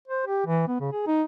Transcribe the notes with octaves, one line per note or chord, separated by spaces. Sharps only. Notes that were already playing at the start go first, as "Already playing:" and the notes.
C5
G4
E3
B3
C#3
G#4
D#4